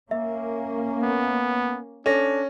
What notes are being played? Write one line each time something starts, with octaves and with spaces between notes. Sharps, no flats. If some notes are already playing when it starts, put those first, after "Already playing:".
A#3 C#4 E5
B3
C#4 D4 A4 A#6